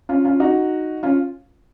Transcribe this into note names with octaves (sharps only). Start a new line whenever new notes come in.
C#4 F4
C#4 F4
D#4 F#4
C#4 F4